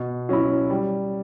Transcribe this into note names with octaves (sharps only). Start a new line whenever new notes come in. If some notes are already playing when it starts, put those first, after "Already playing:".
Already playing: B2
F#3 C#4 E4
G3